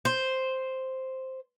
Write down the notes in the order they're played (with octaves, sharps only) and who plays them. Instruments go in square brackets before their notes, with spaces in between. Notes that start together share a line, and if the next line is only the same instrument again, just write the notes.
[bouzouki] C5